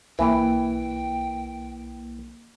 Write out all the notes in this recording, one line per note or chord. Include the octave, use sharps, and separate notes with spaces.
B1 E3 A#3 G5